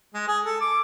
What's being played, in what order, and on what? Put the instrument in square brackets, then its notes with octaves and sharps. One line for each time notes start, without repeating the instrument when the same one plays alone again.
[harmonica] G#3
G#4
A4
D6